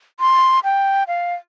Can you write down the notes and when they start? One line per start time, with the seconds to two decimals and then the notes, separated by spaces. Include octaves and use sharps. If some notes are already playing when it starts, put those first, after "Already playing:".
0.20 C6
0.64 G5
1.08 F5